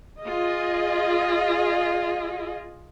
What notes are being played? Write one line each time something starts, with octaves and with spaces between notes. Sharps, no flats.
F4 G#4 D#5